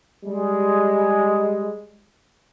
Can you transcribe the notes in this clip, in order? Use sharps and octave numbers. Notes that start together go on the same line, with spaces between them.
G3 G#3